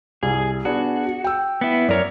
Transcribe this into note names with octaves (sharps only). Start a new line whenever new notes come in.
C2 G#4
B3 D4 F#4 G#4
G5 E6
B3 E4
F#2 A#4 C#5 D5